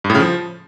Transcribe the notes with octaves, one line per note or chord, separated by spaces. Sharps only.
G2
A2
C#3
F3